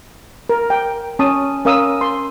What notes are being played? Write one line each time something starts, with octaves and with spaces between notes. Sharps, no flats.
A#4
G5
C#4 A5 D#6
C#4 A#4 F5 D#6 E6
C6